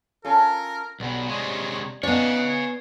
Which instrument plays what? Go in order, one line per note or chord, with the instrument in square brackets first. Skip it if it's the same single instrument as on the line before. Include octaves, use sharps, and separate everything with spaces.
[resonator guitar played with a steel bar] C#4 F4 A4 [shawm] A#4
[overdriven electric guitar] B1 B2 [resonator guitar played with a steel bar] G3 B3
[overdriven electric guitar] C3 G#3 [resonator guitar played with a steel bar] G3 [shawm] C#5
[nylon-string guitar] B3 D5 [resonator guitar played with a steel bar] C#4 D#4 [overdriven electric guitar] C#5 F5 [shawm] F#5
[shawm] G#5